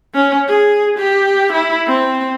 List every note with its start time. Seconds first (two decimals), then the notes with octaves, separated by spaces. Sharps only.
0.14 C#4
0.48 G#4
0.99 G4
1.52 E4
1.87 C4